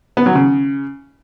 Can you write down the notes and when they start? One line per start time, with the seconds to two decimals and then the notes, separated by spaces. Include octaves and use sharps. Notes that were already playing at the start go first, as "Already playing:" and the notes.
0.17 B3
0.26 F#3
0.35 C#3